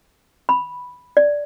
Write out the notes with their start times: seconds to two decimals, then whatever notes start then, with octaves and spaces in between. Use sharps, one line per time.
0.49 B5
1.17 D5